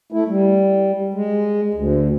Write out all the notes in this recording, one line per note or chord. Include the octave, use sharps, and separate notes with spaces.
A3 E4
G3
G#3
D2